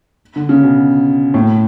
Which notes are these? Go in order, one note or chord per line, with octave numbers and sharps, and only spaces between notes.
D3
C#3
B2
A2